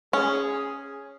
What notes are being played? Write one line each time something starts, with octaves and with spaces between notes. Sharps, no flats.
C#4 G#4